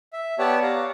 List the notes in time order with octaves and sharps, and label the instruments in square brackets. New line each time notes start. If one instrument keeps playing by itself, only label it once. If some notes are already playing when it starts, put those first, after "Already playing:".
[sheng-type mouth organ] E5
B3 G4 C#5 D5 F#5 A5
F5 A#5